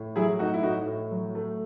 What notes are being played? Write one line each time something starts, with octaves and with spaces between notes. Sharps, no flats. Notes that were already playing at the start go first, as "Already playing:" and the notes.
Already playing: A2
F#3 E4 G#4
A3 D#4 F#4
E4
A2 D#4 F#4
A2
F#3
A3